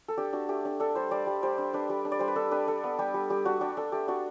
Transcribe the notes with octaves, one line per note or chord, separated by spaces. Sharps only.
A4
D4 G4
D4 F#4
A3 G4
D4
D4 A4
G3 C5
G3 D5
G3
G3 C5
D4
D4 B4
G3
D4
D5
G3 C5
B4
D4 A4
D4 B4
D4 A4
B3
G3 G4
G3
G3 G4
D4 F#4
D4 G4
D4 A4
A3 G4
D4 F#4